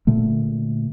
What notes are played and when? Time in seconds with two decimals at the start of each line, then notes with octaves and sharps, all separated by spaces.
0.07 A#2 D3 A3